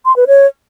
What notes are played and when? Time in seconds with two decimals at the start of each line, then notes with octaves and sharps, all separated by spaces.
0.05 C6
0.16 B4
0.27 C#5